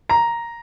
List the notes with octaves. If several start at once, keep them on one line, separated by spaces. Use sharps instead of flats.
A#5